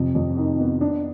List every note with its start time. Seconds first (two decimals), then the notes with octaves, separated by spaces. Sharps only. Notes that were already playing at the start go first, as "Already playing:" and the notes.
Already playing: F2 C3
0.15 F2
0.37 D#3
0.60 B3
0.81 D4